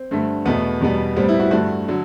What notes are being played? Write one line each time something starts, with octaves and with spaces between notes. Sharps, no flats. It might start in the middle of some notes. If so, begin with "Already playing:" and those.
Already playing: C4
G2 D3 A3
E2 B2 A3 B3
E2 B2 G3 B3
A2 G3 B3 C4
E4
F#4
G2 D3 A3 F#4
D3 F#3